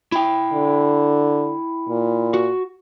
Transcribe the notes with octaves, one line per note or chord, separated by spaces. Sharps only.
E4 G5
D3
A#2
F#4